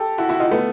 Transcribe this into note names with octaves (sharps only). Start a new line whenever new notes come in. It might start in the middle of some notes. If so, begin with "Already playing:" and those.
Already playing: G4 A4
E4 F#4
E4 F#4
D#4 F4
A3 B3